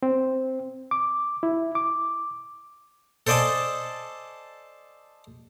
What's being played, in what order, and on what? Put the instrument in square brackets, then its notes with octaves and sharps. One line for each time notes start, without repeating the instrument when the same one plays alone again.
[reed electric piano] C4
D6
E4
D6
[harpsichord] A4 C5 D5 D#5 G#5 A5